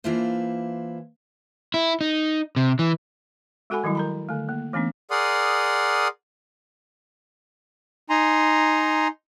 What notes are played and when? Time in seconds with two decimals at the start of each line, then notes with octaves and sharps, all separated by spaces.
0.04 E3 A#3 D4 E4 F4 C5
1.74 E4
2.01 D#4
2.56 C3
2.79 E3
3.70 G#3 F#4 A4 F#5 G#5 B5
3.84 D#3 F#3 G3 E4
3.95 A#4 A#5 B5
4.29 D3 A3
4.49 A#3
4.73 E3 A3 B3 C#4 D4
5.11 G#4 A#4 D5 F#5 C6 D#6
8.10 D#4 G#5 A#5 C6